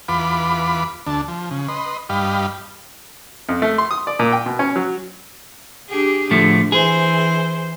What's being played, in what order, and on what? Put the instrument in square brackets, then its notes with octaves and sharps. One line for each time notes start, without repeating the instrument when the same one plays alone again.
[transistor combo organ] E2 F4 B4 B5 D6
D2 D4 A5
F3
C#3
B4 D#5 C6
G2 G4 D#5 F5 B5
[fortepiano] F2
A3
C6
D#6
D5
A#2
G5
B2
C#4
F#3
[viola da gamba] D4 G4 G#4
[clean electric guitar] A2 F3 A3 [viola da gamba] D3
[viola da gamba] E3 C5 [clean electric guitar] G#4